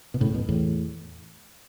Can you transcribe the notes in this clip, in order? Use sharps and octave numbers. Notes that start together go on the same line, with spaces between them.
B2
A2 C#3
F#2 B2
E2 A2